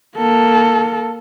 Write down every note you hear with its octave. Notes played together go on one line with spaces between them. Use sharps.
A#3 A4